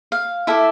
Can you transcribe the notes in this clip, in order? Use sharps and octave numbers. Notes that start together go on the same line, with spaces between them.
F5
E4 A4 D5 E5